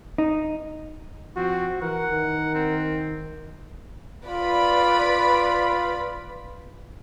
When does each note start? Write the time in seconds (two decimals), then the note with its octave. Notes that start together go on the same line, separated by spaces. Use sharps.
0.18 D#4
1.36 F3 C4 F#4
1.82 E3 A#4 F#5
2.11 D#3
2.55 C4
4.26 F4 B4 D5 B5